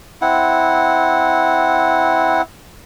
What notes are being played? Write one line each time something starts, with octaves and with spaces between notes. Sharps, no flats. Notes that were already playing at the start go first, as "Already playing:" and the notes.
C4 E4 F#5